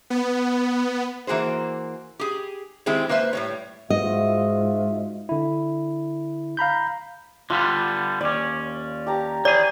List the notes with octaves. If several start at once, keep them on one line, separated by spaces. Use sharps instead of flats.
B3
E3 A#3 F#4 G#4 C5
G4 G#4
D#3 G#3 C4 E4 G4 G#4
A#3 B4 C5 E5
A2 G3 C#5
G#2 F4 F#4 D#5 E5
D3 E4
F5 A#5 B5 G6
D3 G3 B3 F4
D#2 C#4 D5
G4 A5 A#5
E3 G#4 D5